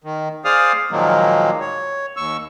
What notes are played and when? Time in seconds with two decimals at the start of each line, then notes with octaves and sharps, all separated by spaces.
0.04 D#3
0.45 G#4 C5 D5 F5 D#6 F6
0.91 A#2 D#3 F3 F#3 G#3 A#3
1.60 C#5
2.17 D#2 C#6 E6